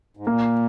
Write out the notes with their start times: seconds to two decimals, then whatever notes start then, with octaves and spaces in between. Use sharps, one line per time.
0.17 G#2
0.27 A#2 A#3